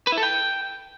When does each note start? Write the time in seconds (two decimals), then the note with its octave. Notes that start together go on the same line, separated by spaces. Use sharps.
0.07 B4
0.12 E4
0.17 A4
0.23 G5